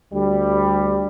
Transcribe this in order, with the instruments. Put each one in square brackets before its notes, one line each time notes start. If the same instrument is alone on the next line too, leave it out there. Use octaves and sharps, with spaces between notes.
[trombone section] D2 G3